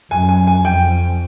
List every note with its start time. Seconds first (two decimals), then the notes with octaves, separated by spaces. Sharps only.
0.11 F#2 G#5
0.29 G#5
0.47 G#5
0.64 F2 G5